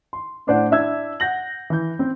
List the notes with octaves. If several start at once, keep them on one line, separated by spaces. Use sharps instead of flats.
C6
A2 D4 C5 D5 F#5
D4 E4 E5 E6 G#6
F#5 G6 A#6 F#7
E3 G6
C4